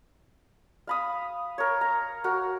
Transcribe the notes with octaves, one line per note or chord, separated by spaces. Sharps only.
F5 B5 D#6
A#4 C#5
A#5
F#4 A#4